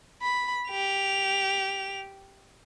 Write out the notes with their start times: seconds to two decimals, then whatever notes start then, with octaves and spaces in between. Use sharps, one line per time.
0.22 B5
0.70 G4 F7